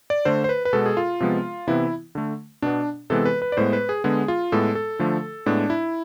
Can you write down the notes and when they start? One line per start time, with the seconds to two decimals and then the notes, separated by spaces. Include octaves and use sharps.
0.10 D5
0.25 D3 A3 C5
0.44 C5
0.49 B4
0.65 B4
0.73 B2 G#3 B3 A4
0.86 G#4
0.97 F4
1.20 C3 F3 G#3 B3
1.67 C3 E3 B3 E4
2.15 D3 A3
2.62 B2 B3 D4
3.10 C3 E3 G#3 B3 A4
3.25 B4
3.42 B4
3.52 D5
3.57 A2 G#3 B3 C5
3.73 B4
3.89 G#4
4.04 D3 G#3 B3 G#4
4.28 F4
4.52 A2 G#3 B3 A4
4.75 A4
4.99 D3 F3 A3
5.46 A2 G#3 B3 D4
5.70 E4